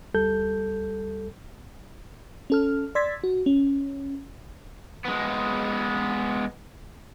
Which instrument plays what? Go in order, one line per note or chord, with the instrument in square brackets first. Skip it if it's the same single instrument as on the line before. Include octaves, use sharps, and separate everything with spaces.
[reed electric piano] D2 G3 A4 G6
[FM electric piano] C#4 A4 F6
D5 C6 E6 G#6 A6 B6
F#4
C#4
[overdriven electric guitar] G#3 B3